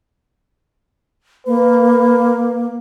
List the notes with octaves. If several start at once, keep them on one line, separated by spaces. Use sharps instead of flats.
A#3 B4